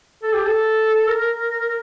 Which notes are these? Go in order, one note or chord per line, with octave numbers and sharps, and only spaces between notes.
A4
G4
A4
A#4